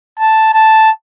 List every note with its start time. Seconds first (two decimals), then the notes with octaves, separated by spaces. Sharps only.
0.19 A5
0.54 A5